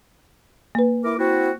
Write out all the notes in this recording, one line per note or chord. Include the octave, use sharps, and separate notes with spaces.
A#3 B4
E4 A#4 D6
C4 E4 F#4